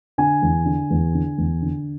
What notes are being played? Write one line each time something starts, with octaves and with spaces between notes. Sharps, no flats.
D3 G#5
E2
D3
E2
D3
E2
D3